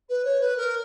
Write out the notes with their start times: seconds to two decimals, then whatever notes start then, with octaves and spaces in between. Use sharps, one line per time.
0.09 B4
0.24 C#5
0.40 B4
0.56 A#4